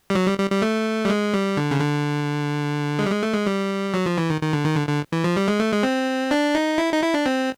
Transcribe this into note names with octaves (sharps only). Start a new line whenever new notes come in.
G3
F#3
G3
G3
G3
A3
G3
G#3
G3
D3
C#3
D3
G#3
G3
G#3
A3
G#3
G3
F#3
F3
E3
D#3
D#3
D3
D#3
D3
D3
E3
F3
G3
G#3
A3
G#3
C4
D4
D#4
E4
D#4
E4
D4
C4